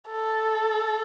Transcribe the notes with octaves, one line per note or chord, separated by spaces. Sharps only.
A4